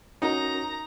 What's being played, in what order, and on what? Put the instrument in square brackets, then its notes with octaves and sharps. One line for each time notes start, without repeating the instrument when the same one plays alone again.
[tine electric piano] C#4 F#4 A#4 [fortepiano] D#4 [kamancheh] A#5